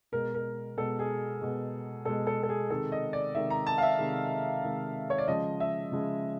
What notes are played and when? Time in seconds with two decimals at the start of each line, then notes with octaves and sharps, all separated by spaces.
0.12 B2 G#3 A#4
0.34 A#4
0.77 B2 G#3 A4
0.99 G#4
1.42 B2 G#3
2.05 B2 G#3 A4
2.27 A4
2.43 A4
2.49 G#4
2.70 C3 D#3 G#3 A4
2.92 D#5
3.13 D5
3.35 C3 D#3 G#3 E5
3.50 A#5
3.67 A5
3.78 F5
3.83 E5
3.98 C3 D#3 G#3
4.63 C3 D#3 G#3
5.10 C#5
5.18 D5
5.28 C#3 F3 G#3 D#5
5.60 E5
5.92 C#3 F3 G#3